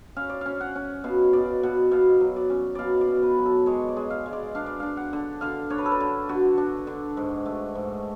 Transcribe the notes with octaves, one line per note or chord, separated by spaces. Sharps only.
C#4 F5
D5
C#4 F5
F#5
C#4
B2 F5
B2 D5
B2 F#5
B2 F5
F#3
D5
C#4
B2 D5 F5
D5
B2
B4
F#3
A4
G#3 C#5
D5
G#3
F5
G#3
D5
D4 F5
D5
D4 F5
F#5
D3
D3 F5
D4 C#5
B4
A4
B4
D3
D3 F#4
D4
D3
G#2
A3
G#2